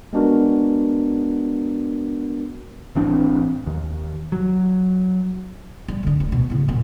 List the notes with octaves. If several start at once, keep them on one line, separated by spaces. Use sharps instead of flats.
G#3 B3 D4 F#4 A#4
A1 E3 C4 D4
D#2
F#3
G3
D3 D4
D1
B2
A2 C#3
F#2 A#2